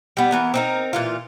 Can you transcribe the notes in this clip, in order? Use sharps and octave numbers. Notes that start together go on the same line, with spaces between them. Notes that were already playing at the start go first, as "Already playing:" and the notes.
G3 B3
E3 B3 A#4
C4 D#4 A#4
A#2 E3 F4